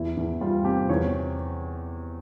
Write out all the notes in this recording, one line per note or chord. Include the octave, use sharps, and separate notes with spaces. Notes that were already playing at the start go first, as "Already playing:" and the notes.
Already playing: E2 E4
E2
G3 F4
C3 G4
E2 C#5